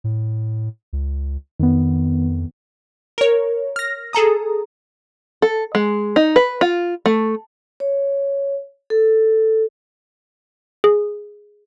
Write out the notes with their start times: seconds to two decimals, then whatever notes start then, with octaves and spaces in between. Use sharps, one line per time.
0.04 A2
0.93 C#2
1.59 F2 D#3 B3
3.18 A#4 C#5
3.76 F6 A#6
4.13 G#4 A4 A#5 D#6
5.42 A4
5.75 G#3
6.16 D#4
6.36 B4
6.61 F4
7.06 A3
7.80 C#5
8.90 A4
10.84 G#4